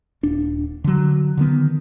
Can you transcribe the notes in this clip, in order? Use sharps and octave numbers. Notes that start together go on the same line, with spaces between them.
D#1 D4
D3 F#3
D3 D#3 B3